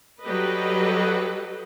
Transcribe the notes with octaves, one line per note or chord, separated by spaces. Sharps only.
F#3 G3 G4 A4 B4 D#5